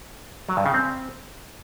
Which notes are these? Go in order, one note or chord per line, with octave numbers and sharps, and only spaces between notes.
F#3
G2
C#3
C4